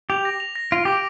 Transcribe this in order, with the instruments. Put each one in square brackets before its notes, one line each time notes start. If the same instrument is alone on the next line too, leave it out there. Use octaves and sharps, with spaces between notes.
[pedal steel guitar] G4 [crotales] F7
[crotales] A#6
F7
A#6
[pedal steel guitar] F4 [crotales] D7
[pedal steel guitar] G4 [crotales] D6